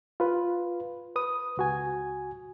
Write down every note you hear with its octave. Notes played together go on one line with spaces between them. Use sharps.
F4 B4
B4 D#6
C#2 F#4 G#5